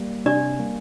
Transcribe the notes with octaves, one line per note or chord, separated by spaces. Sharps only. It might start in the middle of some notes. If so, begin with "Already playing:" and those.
Already playing: G3 A#3
C3 D4 D5
G3 A#3